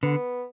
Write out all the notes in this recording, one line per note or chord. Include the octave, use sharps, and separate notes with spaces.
D3 B3